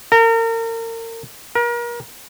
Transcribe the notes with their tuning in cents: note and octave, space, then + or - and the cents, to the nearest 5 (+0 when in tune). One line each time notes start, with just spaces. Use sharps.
A#4 -35
A#4 +35